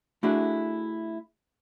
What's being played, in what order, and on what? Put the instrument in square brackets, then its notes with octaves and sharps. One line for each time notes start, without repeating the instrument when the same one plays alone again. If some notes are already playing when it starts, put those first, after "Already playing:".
[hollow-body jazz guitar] A3 D4 E4 F#4 G#4